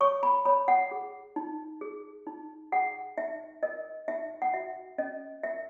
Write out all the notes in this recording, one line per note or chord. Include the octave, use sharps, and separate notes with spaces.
C#5 C#6
B5
C#5 B5
F#5
G#4
D#4
G#4
D#4
G#4 F#5
D#4 E5
A#4 D#5
D#4 E5
F#5
F#4 E5
C#4 D#5
A#4 E5